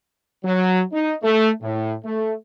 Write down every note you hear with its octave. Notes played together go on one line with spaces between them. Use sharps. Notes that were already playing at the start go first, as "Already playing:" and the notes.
F#3
D#4
A3
A2
A3